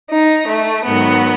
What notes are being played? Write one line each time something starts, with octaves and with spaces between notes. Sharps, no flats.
D#4
A3
G#2 D#3 F#3 B3